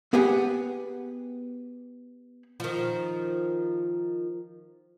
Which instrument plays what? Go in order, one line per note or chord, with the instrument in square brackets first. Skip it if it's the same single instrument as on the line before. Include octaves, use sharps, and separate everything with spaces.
[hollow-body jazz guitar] B3 G4 G#4 B4 F#5 G#5
[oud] D#3 F3